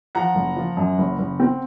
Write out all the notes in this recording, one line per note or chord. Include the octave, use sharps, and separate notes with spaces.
F3 F#5 A#5
F#1
F3
F#2
F#1
F#1
C4